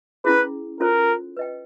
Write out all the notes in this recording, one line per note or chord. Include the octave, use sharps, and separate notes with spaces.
C#4 E4 G#4 B4
C#4 F4 A4 A#4 C5
B4 D#5 G5